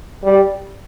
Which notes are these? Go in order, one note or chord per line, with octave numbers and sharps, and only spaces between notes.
G3